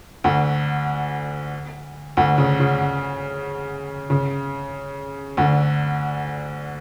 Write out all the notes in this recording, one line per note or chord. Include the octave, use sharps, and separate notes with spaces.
D2 D3
D2 D3
C#3
C#3
C#3
D2 D3